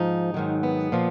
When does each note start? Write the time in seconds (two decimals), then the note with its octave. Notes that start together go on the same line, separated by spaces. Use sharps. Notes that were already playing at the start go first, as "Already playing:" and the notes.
Already playing: G#2 F3 D#4
0.34 G#2 D#3 F#3
0.63 B3
0.92 A#2 F3